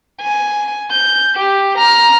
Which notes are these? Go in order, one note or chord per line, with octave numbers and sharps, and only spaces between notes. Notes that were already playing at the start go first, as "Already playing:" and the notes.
G#5
G6
G4
A#5 F6